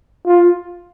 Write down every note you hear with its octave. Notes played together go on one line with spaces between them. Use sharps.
F4